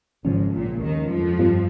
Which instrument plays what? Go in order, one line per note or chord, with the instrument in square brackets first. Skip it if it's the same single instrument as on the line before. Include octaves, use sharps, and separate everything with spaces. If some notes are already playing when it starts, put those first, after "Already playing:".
[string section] G#1 G#2 [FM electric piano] C#3 F3 G#3 C#4
[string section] A#1 A#2
D#2 D#3
F2 F3
[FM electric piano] G2 G3 C4 F4